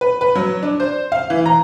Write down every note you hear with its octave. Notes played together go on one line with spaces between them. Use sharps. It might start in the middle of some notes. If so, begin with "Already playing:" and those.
B4
B4
F#3
D4
C5
F5
E3
A#5